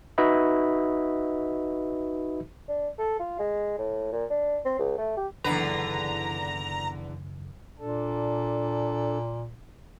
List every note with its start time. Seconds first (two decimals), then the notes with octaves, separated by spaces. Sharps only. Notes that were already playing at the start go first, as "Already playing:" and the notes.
0.18 D#4 F#4 B4 D#5 E5 B5
2.68 D4
2.99 A4
3.20 F4
3.39 G#3
3.78 A2
4.12 A#2
4.30 D4
4.65 C4
4.79 C#2
4.98 A3
5.17 G4
5.44 F#1 E2 D3 D#3 B4 A#5
7.79 A#2 D4 A4